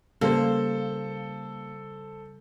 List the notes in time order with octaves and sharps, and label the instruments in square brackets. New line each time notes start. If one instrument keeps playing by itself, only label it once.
[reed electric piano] C#3 G3 [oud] A#3 [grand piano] A4 C5